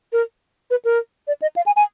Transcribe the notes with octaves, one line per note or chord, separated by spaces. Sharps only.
A#4
B4
A#4
D5
D#5
F5
G#5
G#5